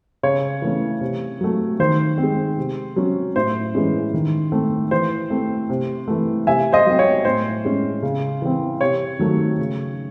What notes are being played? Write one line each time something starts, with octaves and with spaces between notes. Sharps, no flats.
C#3 C#5
E3 A3 C#4
C3
F#3 A3
D#3 C5
C4
G#3
C3
F#3 C#4
A2 C5
E3 G#3 C#4
D#3
A3 C4
E3 C5
A3 C4
C3
E3 A3
C3 E5 G#5
C5 D#5
F#3 C4
C#5
A2 C5
G#3 C#4
C#3
E3 C4
C3 C#5
D#3 F#3 A3
C#3